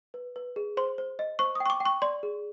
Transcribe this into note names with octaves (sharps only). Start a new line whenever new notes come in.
B4
B4
G#4
C5 C6
C5
D#5
C5 C#6
G5 D#6
C#6
D6
G5
C#6
D5 C6
G#4